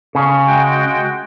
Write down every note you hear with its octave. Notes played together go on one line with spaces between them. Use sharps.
C#3
G#3 F#4 G5